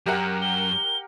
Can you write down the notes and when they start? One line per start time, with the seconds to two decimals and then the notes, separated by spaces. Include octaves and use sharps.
0.06 F#2 G4 A#4 F#5
0.42 G7